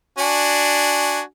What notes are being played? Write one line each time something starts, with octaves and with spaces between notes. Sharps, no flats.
D4 F#4 G#5